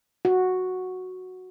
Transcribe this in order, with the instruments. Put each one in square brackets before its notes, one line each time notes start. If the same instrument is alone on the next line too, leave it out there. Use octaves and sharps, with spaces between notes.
[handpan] F#4